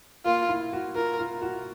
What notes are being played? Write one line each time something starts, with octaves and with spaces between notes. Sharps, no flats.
A#3 F4
E4
F#4
F4 A#4
F4
F#4